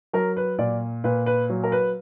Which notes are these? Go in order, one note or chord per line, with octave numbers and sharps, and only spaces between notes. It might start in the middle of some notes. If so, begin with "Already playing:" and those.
F#3 A#4
B4
A#2 D5
A#2 B4
B4
F#3
A#4
B4